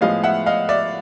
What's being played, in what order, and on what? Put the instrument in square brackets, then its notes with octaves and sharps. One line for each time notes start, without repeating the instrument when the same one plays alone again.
[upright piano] A2 F3 G#3 B3 D#5 F5
E5 F#5
D#5 F5
D5 E5